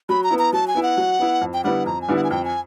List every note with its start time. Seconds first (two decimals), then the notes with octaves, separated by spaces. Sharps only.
0.09 F#3 B5
0.24 A#5
0.30 B3 E4
0.39 A#5
0.53 F#3 A5
0.68 G#5
0.75 B3 E4
0.83 F#5
0.97 F#3
1.19 B3 E4
1.41 F2
1.54 G5
1.64 D3 G3 B3 E4 F#5
1.86 F2 A#5
2.02 G#5
2.08 D3 G3 B3 E4
2.16 F#5
2.24 G#5
2.31 F2 G5
2.45 G#5